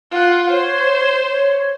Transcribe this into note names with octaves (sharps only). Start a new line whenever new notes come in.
F4 F#5
C5 C#5
C#5